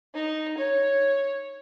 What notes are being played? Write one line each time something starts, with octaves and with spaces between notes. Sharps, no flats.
D#4
C#5